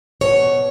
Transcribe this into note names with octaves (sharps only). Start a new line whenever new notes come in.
B2 C#5